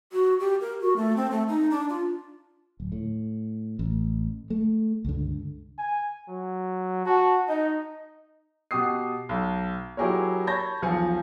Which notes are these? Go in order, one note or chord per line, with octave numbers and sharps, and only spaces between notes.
F#4
G4
A#4
F#4
A3
C4
A3
D#4
D4
F4
D1
A2
A1
A3
C#2 G2 D3
G#5
F#3
F#4 A5
D#4 D#5
B2 G4 F#5 D#6 C7
B1
F#3 E4 G4 G#4 A#4 C#5
C#5 A5 B5 G6 G#6 A#6
B1 E2 F3 G#5 C#7